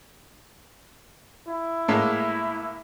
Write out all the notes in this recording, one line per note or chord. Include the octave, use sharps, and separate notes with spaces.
E4
A2 G#3 A#3